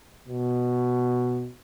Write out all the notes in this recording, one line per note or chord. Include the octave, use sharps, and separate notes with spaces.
B2